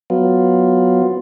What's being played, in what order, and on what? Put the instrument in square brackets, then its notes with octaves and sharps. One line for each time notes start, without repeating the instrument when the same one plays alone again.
[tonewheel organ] F#3 B3 F4